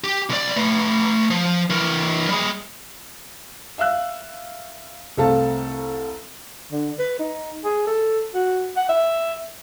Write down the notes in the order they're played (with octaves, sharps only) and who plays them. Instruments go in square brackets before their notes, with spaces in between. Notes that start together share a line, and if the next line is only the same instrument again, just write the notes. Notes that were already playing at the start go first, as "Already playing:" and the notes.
[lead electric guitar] G4
C2 D5
A3 B4
F3
E3 A#4
G3 G#4
[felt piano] E5 F5 E6 F#6
C2 A3 C4 A4 F5 A5
[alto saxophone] D3
B4
D#4
G#4
A4
F#4
F#5
E5